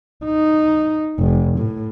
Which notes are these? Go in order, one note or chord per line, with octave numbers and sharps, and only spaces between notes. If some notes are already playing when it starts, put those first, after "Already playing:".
D#4
F1
A2